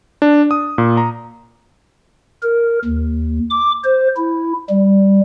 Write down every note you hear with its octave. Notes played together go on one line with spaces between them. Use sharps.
D4
D#6
A#2
A#5
A#4
D#2
D6
C5
E4
G3